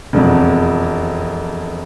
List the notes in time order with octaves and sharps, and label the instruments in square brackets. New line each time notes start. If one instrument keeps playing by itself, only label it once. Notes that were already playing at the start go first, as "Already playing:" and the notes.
[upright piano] E1 F2